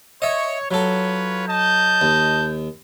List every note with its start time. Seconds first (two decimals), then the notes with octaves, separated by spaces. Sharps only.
0.22 C#5 D#5 E5
0.71 F#3 F4 A4 B4 C#5
1.48 D#5 A5 G6
2.01 D#2